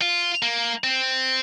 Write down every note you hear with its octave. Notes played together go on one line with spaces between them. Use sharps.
F4
A#3
C4